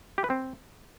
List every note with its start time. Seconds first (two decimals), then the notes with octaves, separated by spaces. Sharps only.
0.18 G4
0.24 B4
0.30 C4